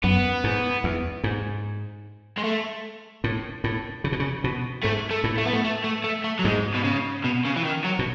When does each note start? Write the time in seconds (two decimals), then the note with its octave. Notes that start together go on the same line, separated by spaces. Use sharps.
0.03 F#2 B3
0.44 G#2
0.84 E2
1.24 G#2
2.38 G#3
2.44 A3
3.24 A2
3.64 A2
4.04 C#3
4.12 B2
4.20 C#3
4.44 B2
4.84 G#2 A3
5.11 A3
5.24 A2
5.38 A3
5.45 B3
5.53 A3
5.64 A3
5.84 A3
6.04 A3
6.24 A3
6.39 F#3
6.44 G#2 G#3
6.74 B2
6.84 C#3
7.24 B2
7.45 C#3
7.56 E3
7.64 D#3
7.84 F#3
7.99 B2